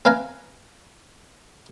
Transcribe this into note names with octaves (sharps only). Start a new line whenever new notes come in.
C4 B4 F5 G#5 A#5